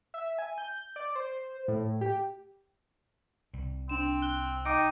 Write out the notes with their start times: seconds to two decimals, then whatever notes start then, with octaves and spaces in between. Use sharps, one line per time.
0.14 E5
0.38 G#5
0.58 G6
0.96 D5
1.15 C5
1.68 A2
2.01 G4
3.53 C2 G3
3.89 C4 D4 E7
4.22 F#6 G7
4.65 D#4 G5 D6 D7